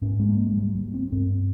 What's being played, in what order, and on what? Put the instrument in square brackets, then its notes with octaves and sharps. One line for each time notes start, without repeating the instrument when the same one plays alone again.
[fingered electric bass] G#2 C#4
G#3
A#3
G#3
G3
G3
C4
G2 C4